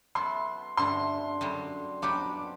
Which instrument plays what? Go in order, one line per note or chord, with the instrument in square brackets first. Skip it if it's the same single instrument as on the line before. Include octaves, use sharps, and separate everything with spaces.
[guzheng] F#3 B3 E4 A4 [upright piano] C6
[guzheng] G2 D3 A3 [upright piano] C6
[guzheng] F#2 D3 G3
[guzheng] F#3 B3 D4 G4 [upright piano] D6